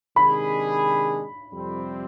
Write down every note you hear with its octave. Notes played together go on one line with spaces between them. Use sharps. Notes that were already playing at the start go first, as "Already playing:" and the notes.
C3 D#3 G#3 D4 G#4 B5
F2 C3 G3 C4